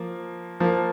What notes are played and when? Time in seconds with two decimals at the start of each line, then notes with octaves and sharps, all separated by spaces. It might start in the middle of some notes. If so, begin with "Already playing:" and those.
Already playing: F3 A#3
0.60 F3 A#3